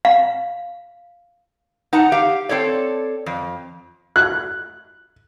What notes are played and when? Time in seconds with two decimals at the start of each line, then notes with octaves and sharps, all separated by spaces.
0.05 F5
1.93 D#4 F#5 A5 A#5
2.12 G4 F5
2.49 C4 A4 C#5 D5
3.26 F2
4.16 F#6